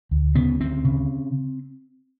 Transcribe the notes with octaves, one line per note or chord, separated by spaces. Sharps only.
D2
C#3 B3
D2 C4
C#3